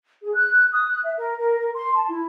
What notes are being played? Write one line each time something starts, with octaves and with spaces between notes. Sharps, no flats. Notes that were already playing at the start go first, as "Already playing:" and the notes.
G#4
F#6
D#6
F#6
E5
A#4
A#4
A#4
C6
A5
E4